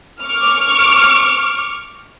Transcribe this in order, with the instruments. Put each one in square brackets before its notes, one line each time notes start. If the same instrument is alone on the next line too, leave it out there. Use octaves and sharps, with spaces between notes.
[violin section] C#6 D6 F6